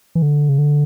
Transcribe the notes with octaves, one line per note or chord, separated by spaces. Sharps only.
E3
D3
C#3
D3